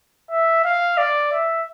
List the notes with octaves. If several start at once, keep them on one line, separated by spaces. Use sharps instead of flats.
E5
F5
D5
E5